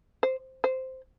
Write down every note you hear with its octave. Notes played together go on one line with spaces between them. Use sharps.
C5
C5